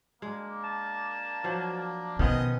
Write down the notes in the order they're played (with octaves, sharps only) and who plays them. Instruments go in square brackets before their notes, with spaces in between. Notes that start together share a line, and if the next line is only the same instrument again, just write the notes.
[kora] G#3 [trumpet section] A#3 D4
[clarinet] A5
[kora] F3 F#3
[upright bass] B2 [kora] D#3 F3 B3 [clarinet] C#4 [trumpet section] G#4 D#5